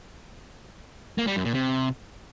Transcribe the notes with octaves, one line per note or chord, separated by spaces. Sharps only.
A#3
G3
F#2
A#2
C3